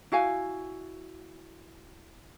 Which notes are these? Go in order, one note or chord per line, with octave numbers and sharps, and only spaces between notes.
E4 F#4 F5 G#5